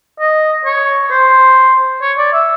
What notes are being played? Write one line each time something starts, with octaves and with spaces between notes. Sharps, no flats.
D#5
C#5
C5
C#5
D5
E5